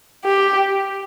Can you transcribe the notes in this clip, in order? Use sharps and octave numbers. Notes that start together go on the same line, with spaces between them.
G4